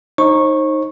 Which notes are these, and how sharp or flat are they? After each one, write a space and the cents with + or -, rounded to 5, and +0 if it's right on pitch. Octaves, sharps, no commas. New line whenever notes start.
D#4 +0 C5 +40 C#6 -15